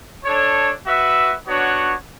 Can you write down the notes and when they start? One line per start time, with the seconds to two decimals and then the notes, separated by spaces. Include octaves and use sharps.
0.25 D4 A4 C#5
0.85 F#4 B4 E5
1.46 B3 D4 F#4 C#5 F#5